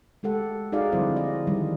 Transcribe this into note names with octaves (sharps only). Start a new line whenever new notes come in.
G#3 G4 A4 F#5
D#4 F#4 G#4 D5 F5
D3 F3 G3 C4 E4 C5
D#5
D#3 E3 G3